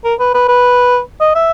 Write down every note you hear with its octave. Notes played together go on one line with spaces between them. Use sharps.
A#4
B4
B4
B4
D#5
E5